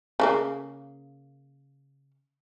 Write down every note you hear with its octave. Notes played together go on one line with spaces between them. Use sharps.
C#3 A3 A#3